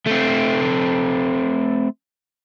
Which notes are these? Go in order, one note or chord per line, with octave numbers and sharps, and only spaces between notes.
A3 C4